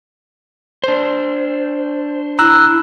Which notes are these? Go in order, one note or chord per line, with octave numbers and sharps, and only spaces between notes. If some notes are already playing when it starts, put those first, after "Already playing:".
D4 C5
E4 A#5 E6 F#6